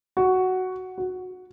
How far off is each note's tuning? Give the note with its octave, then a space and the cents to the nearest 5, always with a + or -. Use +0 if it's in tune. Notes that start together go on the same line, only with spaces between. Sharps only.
F#4 +5
F#4 -10